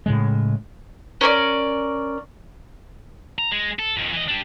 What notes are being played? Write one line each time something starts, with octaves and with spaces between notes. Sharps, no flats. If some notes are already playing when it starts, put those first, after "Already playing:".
A2 C#3 G#3
C#4 A#4 C#5 D5
A#5
G#3
A4
F2 D#3
E3 D#5
D4 G4